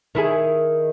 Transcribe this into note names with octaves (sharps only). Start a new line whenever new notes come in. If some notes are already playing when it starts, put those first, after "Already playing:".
D#3 E4 G#4